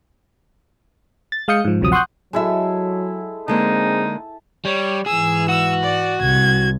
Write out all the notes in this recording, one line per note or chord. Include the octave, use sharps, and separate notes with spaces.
A6
G#3 F5 D#6 G6 C#7
G#2 F3
G#1 D2 C3 F3 F#3 D#6
F#5 C6 C#6 D#6 F#6 G6
F#3 G#3 E4 F#4 A4 E5
D3 G#3 A#3 C4 D#4 G#4 A5
G3 C#5
G#2 E3 G#4 E6
F#4 E6
D5
C2 G#6